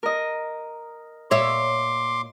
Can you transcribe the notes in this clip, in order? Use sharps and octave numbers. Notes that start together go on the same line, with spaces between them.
A#4 D#5
A#2 C#5 E5 C6 D6